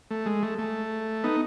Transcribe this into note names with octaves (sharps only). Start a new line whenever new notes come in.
A3
G#3
A3
A3
B3 D#4